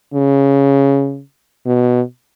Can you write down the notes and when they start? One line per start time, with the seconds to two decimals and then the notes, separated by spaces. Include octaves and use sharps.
0.14 C#3
1.66 B2